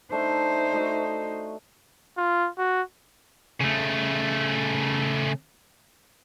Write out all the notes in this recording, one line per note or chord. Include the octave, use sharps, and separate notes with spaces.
A3 D4 D#4 C5 E5
A3 F#4 D#5
F4
F#4
C#3 A3